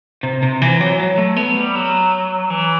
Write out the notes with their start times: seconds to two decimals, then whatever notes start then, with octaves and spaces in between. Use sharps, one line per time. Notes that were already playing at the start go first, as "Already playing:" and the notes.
0.23 C3
0.43 C3
0.62 E3
0.81 F#3
0.99 F#3
1.18 A3
1.36 B3
1.56 G3
1.75 F#3
2.50 E3